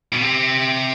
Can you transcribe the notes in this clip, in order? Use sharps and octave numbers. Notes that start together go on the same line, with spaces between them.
B2
C3